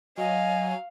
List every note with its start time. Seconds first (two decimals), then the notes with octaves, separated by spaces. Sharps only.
0.18 F#3 D#5 F5 G#5